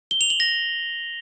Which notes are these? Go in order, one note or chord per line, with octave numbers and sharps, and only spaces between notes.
G7
F7
F#7
A#6